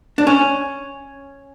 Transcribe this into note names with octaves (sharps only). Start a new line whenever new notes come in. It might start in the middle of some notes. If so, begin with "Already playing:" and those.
D4
C#4